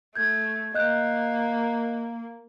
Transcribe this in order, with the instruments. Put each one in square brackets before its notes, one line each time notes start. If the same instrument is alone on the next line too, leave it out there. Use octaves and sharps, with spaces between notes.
[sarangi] A3 [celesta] G6 G#6
[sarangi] A#3 [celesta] D#5 F#6 G6